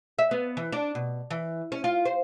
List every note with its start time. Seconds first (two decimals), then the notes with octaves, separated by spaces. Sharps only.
0.19 E5
0.31 B3
0.57 E3
0.72 D4
0.95 B2
1.31 E3
1.72 C#4
1.84 F4
2.05 C5